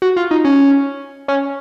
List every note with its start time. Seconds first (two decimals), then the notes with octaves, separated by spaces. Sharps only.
0.02 F#4
0.16 F4
0.31 D#4
0.44 C#4
1.28 C#4